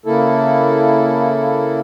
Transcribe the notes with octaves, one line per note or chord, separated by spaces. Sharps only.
C#3 A#3 E4 A4